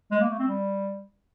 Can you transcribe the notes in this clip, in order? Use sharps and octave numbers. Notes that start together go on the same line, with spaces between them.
G#3
A#3
A3
C4
G3